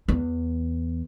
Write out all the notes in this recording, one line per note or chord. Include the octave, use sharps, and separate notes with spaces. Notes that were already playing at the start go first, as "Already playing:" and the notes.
E2